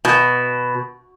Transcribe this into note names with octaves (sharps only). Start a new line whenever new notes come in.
B2